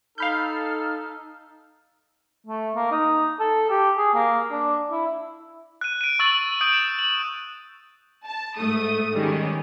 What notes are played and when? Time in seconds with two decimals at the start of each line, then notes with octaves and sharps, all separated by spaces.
0.18 D#4 A4 F5 B5 F6 G6
2.47 A3
2.75 A#3
2.91 D#4
3.40 A4
3.70 G4
3.98 G#4
4.14 A#3
4.51 D4
4.91 E4
5.81 F#6 D#7
6.01 D7 D#7
6.19 C#6 E6 A6 D7 F#7
6.61 D#6 G6 D7
6.73 E7
6.99 F#7
8.25 A5
8.57 G#2 A3 D#6
9.12 D#3 G3 G#3 C#4